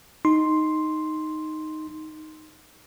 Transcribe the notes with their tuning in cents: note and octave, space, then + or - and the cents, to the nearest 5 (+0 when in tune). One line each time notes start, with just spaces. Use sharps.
D#4 +0 C6 +0